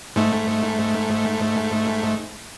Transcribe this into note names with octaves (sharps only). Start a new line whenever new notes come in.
G#2 A3